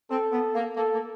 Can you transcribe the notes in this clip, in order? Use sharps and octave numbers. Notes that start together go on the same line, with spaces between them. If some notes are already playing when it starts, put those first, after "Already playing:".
C4 A4
B3
A#3
A#3 A4
A#3